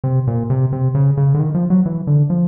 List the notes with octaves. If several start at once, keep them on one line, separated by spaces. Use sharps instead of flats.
C3
A#2
C3
C3
C#3
C#3
D3
D#3
F3
F#3
E3
D3
F3